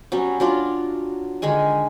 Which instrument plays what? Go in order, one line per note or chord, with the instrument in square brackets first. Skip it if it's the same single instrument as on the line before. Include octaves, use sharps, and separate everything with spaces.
[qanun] F#3 G3 C#4
F#3 D4 F4
D3 D#3 G#3 G#5